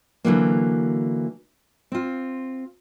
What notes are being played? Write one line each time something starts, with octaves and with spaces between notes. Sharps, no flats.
D3 E3 F#3 A#3
C4 F4